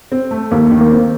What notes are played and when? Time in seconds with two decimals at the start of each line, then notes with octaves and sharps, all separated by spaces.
0.12 C4
0.31 A3
0.51 D#2 A#3
0.71 D#3
0.81 A#3
0.91 C4